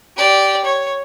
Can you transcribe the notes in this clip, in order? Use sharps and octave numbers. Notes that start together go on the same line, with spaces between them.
G4 D5
C#5